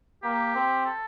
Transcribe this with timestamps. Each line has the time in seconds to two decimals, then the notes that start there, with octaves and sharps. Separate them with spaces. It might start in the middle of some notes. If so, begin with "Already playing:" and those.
0.23 A#3 G4
0.55 C4
0.86 A4